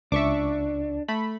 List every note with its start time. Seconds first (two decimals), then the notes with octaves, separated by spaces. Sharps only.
0.12 C#2 D4 E5 C#6 D6
1.08 A3 B5